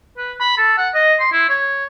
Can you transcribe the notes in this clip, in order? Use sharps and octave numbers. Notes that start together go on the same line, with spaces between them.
B4
B5
A4
F#5
D#5
C6
E4
C#5